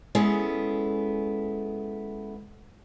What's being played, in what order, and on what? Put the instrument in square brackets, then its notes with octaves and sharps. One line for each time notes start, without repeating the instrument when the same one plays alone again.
[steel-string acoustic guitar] G#3 B3 C#4 E4 G#4 A4